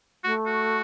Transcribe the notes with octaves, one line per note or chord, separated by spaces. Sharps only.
A3 F#4
F#4